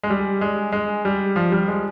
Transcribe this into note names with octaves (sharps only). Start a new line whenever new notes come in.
G#3
G3
G#3
G#3
G3
F3
G3
G#3